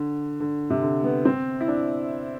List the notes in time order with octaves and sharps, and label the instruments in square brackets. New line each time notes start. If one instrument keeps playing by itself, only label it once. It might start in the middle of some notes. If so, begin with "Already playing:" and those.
Already playing: [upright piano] D3
D3
C3
D3
B3
C4
E4
D4